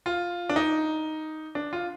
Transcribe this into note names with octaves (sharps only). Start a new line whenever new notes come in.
F4
D4
D#4
D4
F4